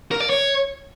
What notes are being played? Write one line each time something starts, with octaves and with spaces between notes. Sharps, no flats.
A#4
D5
C#5